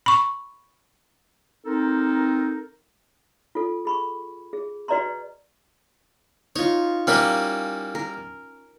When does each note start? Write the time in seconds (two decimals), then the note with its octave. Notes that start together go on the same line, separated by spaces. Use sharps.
0.06 B5 C#6
1.65 C4 D#4 A4 A#4
3.55 F4 A4
3.85 G#4 B5 C#6
4.53 G#4
4.88 F#4 B4 D5 D#5 A#5 C6
6.56 D#4 F4 C#5
7.07 G3 A#3 C#4 E4
7.95 A#4